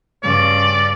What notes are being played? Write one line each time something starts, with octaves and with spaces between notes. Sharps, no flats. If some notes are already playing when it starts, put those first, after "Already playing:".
G2 C#3 D5